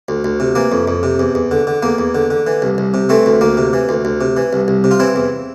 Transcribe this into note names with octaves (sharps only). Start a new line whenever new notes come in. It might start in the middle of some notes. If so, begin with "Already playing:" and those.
D2
D2
C3
E3 A#3
F2
F2
C3
E2
E2
D3
D3
E2 A#3
E2
D3
D3
E3
C2
C2
C3
E3 A3 C4
D2
D2 A#3
C3
E3
D2
D2
C3
E3
C2
C2
C3
F4
E3 C4 E4
E2